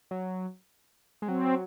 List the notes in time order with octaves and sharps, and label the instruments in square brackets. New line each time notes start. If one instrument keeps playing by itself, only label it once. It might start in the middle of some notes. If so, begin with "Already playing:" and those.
[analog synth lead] F#3
G#3
[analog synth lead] F#3 [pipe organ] C4